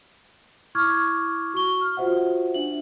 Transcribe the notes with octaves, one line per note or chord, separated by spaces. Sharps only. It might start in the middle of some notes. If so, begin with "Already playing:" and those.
E4 C#6 D6 F6 G#6
F#4 C#6 G7
F6
F4 F#4 C5 E5 F#5
D4 E5 F#7